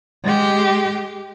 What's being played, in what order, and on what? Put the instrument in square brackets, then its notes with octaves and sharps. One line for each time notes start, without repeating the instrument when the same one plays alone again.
[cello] G#3 G4